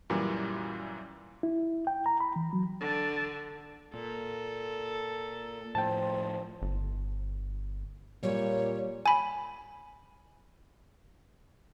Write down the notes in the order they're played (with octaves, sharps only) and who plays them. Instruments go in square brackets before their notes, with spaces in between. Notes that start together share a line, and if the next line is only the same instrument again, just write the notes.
[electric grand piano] F#2 A#2 E3 G3
[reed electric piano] E4
G5
A#5
B5
E3
F#3
[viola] D3
[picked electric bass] A#2 [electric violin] A4
[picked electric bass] A2 F3 [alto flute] C5 [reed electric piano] G5 A5
[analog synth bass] G1
[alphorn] A#2 [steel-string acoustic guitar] G3 [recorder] C#5
[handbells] G#5 B5